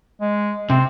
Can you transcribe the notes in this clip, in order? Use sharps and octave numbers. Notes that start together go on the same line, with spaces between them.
G#3
C3 C4